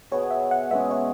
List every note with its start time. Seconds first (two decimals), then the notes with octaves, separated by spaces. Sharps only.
0.11 B2 B3 G#4 C#5
0.31 E5
0.51 F#5
0.71 B2 G#3 C#4 G#4 E5
0.91 C#5